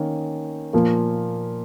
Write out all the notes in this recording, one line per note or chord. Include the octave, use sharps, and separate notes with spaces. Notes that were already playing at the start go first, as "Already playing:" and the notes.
Already playing: D#3 A#3 C#4
A#2 F3 A#3